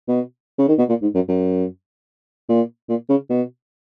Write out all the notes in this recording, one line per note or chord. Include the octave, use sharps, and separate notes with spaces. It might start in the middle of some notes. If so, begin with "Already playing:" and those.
B2
C#3
D#3
B2
A#2
G#2
F#2
F#2
A#2
A#2
C#3
B2